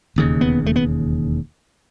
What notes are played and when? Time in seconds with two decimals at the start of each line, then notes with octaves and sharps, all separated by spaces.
0.16 E1 D#2 C#3
0.41 B3
0.66 A3
0.76 B3